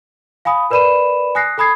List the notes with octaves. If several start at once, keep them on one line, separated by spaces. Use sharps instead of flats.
F5 G#5 B5 D#6
A#4 B4 D5 B5 D#7 E7
G#5 D#6 F#6 A#6 C7
A4 G#5 B5 D#6 G#6 C7